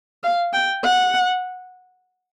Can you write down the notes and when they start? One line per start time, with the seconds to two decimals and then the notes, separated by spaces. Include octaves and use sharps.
0.23 F5
0.53 G5
0.83 F#5